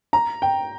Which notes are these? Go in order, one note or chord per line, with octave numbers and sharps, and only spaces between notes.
A#5
G5